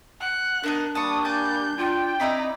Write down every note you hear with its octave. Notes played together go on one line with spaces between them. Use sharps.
F#5 F#6
B3 D4 D#4 A#4
G3 A#3 D5 A5 C#6 D#6
G#5 A5 D6 G6
D4 F4 G5
C4 D#4 E4 D5 B5